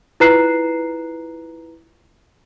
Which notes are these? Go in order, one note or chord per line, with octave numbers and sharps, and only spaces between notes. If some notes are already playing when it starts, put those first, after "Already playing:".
E4 F4 B4 A#5 F#6 C7